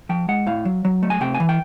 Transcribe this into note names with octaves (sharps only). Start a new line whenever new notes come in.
F3 G5
G#3 F#5
A2 F5
F#3
F#3
A3
G#5
C3 G5
G#5
E3
G5